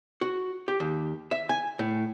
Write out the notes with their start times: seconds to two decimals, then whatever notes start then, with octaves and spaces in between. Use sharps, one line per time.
0.21 F#4
0.68 G4
0.80 D#2
1.31 E5
1.49 G#5
1.79 A2